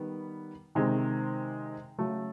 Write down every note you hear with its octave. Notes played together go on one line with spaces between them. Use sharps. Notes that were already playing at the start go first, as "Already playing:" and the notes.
Already playing: D#3 G3 B3
C3 D#3 G#3 C4
C#3 F#3 A3